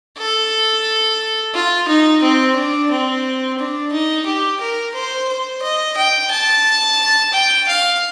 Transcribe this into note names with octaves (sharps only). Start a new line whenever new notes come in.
A4
F4
D#4
C4
D4
C4
D4
D#4
G4
A#4
C5
C5
D#5
G5
A5
G5
F5